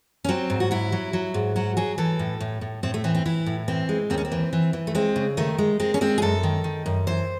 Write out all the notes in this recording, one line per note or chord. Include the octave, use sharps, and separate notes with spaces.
C#4
F#3 C4
G#2
F#4
F#3 E4
F#3
F#3
G#2
F#3 F#4
F#3 G#4
E3 A4
A2
A2
A2
A2 C4
A3
E3 C4
C4
E3 E4
A2
E3 C4
G#3
D#2 C4
C#4
C4
E3
E3
E3
A3
G#3 C4
C#3
D#3 A3
G#3
G#3 C4
C#4
G#3 C4
G#4
F#2 A4
D#3
D#3
F#2
E3 C5